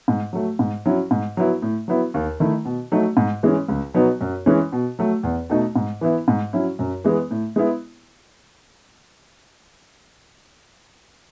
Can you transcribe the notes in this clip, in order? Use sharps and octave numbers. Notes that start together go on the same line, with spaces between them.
G#2
F#3 A3
G#2
F#3 C#4 E4
G#2
F#3 B3 E4
A2
F#3 B3 E4
D#2
D#3 A3 E4
B2
F#3 A3 D#4
G#2
E3 G#3 C#4
C#2
B2 F#3 B3 D#4
F#2
E3 G#3 C#4
B2
F#3 A3
E2
B2 A3 D#4
G#2
E3 B3 E4
G#2
F#3 C#4 E4
F#2
E3 G#3 B3
A2
G#3 B3 E4